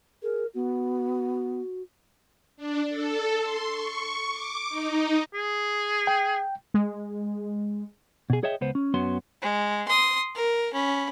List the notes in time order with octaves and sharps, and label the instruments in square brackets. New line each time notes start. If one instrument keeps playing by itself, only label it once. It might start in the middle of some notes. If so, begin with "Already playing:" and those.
[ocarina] G#4 [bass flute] A#4
[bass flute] B3 [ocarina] F#4
[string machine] D4
A4
C6
C#6
D6
D#4
[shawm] G#4
[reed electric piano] G5
[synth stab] G#3
[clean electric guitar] B2 G#4
G#4 C#5 D#5 E5 G5
C#2 B3 C5
C#4
F#2 B3 C#4 F#4 C6
[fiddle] G#3
C6 D#6
A#4
C#4 B5